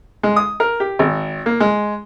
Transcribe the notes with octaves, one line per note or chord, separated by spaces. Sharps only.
G#3
D#6
A#4
G4
G#1
A#3
G#3